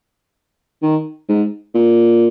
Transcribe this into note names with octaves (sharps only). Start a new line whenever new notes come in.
D#3
G#2
A#2